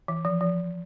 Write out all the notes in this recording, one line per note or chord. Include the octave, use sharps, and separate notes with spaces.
E3
F3
F3